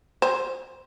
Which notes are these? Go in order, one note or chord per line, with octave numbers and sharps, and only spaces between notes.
C5